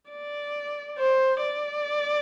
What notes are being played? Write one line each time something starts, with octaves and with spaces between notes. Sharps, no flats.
D5
C5
D5